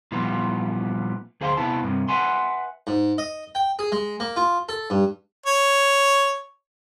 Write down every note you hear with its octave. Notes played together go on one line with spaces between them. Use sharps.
A#2 E3 F3 G3 B3
D2 G#4 C5 F5 F#5 C6
C3 B3 E4 A5
G2 C3
B4 E5 F#5 G#5 C6
G#2
D#5
G5
G#4
G#3
A#3
F4
A4
G2
C#5